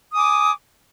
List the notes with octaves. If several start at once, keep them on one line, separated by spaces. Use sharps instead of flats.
G#5 D6 D#6